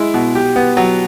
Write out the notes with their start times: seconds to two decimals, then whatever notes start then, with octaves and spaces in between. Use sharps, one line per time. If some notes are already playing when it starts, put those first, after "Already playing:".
Already playing: G#3 E4
0.14 B2
0.35 G4
0.56 B3
0.77 F#3